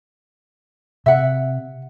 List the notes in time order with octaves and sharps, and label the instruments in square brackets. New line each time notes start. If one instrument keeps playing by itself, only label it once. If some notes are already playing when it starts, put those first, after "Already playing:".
[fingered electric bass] C3 [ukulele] E5 F#5